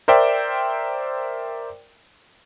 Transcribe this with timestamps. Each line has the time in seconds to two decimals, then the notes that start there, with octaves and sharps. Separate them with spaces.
0.08 A#4 C5 D5 E5 G5